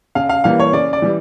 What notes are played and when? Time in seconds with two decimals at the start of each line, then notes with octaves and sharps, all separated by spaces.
0.15 C#3 F5
0.29 F5
0.44 E3 G3 A#3 F5
0.60 C#5
0.73 C#3 D5
0.93 D5
1.02 E3 G3